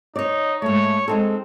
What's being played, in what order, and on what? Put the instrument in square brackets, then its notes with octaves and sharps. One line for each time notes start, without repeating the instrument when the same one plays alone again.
[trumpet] D#4 [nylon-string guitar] C#5 D5
[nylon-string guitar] G#2 A3 [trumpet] C#5
[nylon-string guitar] G#3 D#4 A4 [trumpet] C4